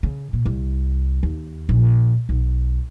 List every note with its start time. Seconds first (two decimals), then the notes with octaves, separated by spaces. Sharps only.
0.03 C#3
0.33 A#2
0.46 C2
1.23 D#2
1.69 A#1
2.29 B1